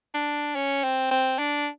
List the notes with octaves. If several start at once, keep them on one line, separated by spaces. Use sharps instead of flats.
D4
C#4
C4
C4
D4